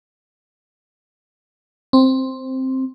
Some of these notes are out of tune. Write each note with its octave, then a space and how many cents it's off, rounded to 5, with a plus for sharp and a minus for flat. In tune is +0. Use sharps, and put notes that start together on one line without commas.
C4 +5